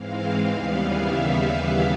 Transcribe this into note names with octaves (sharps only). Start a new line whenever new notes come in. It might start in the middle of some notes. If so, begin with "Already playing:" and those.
Already playing: G#2 E3 G#3 C4 F5
D#2 C#3 E3 G3 B3 F5
E5